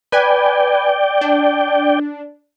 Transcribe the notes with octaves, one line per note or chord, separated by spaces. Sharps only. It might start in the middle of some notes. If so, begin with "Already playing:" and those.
B4 D5 G5 G#5
D4